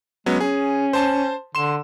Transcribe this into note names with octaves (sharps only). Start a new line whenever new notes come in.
F#3 G#3 B3 C#4
C#4 G#4
C5 A5 C6
D3 C6 E7